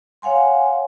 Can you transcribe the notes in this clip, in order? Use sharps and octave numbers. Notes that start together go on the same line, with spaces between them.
C#5 F5 F#5 G#5 C6